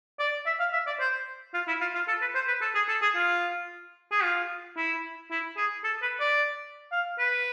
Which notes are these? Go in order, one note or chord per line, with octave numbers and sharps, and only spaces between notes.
D5
E5
F5
E5
D5
C5
F4
E4
F4
F4
A4
B4
C5
B4
A4
G#4
A4
G#4
F4
G#4
F4
E4
E4
G#4
A4
B4
D5
F5
B4